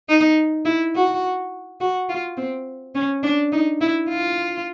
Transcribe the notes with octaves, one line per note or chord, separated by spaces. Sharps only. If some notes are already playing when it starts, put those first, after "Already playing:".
D#4
E4
F#4
F#4
F4
C4
C#4
D4
D#4
E4
F4